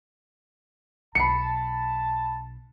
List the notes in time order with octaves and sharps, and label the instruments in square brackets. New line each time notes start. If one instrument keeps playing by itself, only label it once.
[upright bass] B1 [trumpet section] A5 [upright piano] B5 C7 C#7